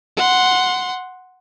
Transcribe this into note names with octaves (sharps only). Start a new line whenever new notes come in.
F#5 C6